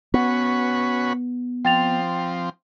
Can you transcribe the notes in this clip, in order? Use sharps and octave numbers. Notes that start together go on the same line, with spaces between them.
B3 C#4 F#4 B4
F3 C4 G5 A6 F7